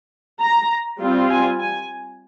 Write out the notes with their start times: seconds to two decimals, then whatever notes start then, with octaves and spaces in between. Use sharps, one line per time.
0.41 A#5
1.01 G3 C4 F4
1.30 G#5
1.59 G#5